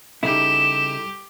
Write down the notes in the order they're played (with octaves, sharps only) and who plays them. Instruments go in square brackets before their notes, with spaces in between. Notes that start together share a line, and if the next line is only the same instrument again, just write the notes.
[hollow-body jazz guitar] C#3 D#4 E4 [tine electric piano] G3 A4 [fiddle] G4 [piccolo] E7